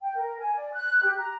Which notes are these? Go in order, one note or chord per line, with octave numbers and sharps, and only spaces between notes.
G5
A#4
G#5
D5
F#6
G4
A#5